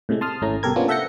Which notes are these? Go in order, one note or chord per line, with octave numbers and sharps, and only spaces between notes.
A2 C3 G#3 A3
A5 C6 D#6 F6
G#1 A2 A3 C#4 A#5
C2 B2 G4 A4 A#4 G#6
F3 A#3 B3 C#4 D4 F4
A4 E5 F#5 G6 A#6 C#7